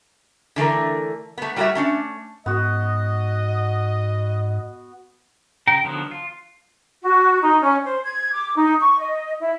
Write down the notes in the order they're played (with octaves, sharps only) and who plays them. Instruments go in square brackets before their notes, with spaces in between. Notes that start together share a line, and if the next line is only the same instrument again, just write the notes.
[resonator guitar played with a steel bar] D3 E3 A3 A#4
A3 B3
G3 A3 F#4 B4 C#5 E5
A3 C#4 D4
[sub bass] G#2 [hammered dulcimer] B3 F#4 [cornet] D#5
[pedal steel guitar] C#3 G5 A#5
D3 D#3 F3 F#3 B3
F4
[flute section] F#4
D#4
C#4
C5
G#6
D6
D#4
C#6
D#5
E4